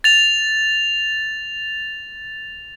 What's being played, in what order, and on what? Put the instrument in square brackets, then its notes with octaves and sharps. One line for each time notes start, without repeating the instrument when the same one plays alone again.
[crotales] A6 F7